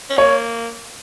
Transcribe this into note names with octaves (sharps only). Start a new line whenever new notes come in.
C#4
A#3 C#5